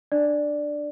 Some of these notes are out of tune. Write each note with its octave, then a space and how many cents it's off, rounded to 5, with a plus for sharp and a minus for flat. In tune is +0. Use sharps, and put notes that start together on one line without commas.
D4 +15 D5 +0